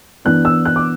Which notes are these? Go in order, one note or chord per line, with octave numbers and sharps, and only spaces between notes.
E3 B3 D4 F#6
E6
F#6
D6